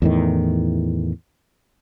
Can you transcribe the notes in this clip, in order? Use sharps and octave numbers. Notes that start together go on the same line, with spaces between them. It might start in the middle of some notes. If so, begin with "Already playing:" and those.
E2 A2 D#3